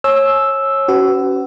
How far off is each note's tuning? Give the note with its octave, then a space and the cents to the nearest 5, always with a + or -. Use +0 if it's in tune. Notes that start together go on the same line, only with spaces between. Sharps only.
C#5 -25 G#5 +40 E6 +0
C#4 +0 F#4 +30 B4 +30